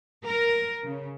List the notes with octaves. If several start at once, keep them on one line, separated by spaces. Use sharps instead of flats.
A#4
C#3